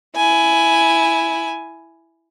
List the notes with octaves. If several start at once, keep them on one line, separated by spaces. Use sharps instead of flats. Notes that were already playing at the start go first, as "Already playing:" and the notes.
E4 G#5